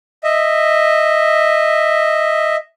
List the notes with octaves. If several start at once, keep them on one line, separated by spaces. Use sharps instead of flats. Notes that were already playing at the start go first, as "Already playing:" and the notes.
D#5 E5